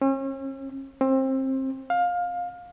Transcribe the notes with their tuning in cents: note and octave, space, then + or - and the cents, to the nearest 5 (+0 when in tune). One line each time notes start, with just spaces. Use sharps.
C#4 -40
C4 +25
F5 +20